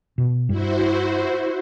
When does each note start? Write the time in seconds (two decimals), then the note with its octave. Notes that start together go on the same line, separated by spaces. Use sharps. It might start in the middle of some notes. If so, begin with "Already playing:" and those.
0.18 B2
0.49 G2 G3 E4 F#4 C5